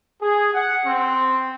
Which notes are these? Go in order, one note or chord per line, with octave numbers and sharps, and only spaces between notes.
G#4
F#5
C4